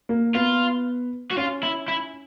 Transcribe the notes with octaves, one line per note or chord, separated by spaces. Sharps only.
A#3
B3 F4
F#4
C#4 F4
E4
E4